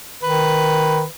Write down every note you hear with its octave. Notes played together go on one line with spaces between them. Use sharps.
D#3 B4